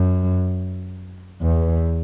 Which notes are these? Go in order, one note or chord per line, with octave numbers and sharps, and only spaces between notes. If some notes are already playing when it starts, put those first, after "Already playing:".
Already playing: F#2
E2